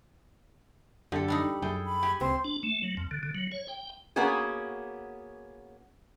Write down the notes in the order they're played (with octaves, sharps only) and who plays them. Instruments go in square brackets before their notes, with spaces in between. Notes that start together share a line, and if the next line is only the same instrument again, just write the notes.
[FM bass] F#2 [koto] D3 [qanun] G4 A4
[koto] G3 D4 D#4 [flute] B5
[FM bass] F#2 [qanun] G#4 A4 G5
[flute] B5
[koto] G4 [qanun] G#5
[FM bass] C#2 [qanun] C4 [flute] C6
[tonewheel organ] D4
A3
F#3
F2
D3
D3
F#3
C#5
G5
[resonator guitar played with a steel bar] A#3 B3 C#4 F#4 G#4